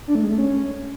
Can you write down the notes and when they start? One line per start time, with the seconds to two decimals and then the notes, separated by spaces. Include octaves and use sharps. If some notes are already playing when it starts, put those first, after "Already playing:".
0.08 D4
0.15 A3
0.23 G#3
0.31 A3
0.38 C#4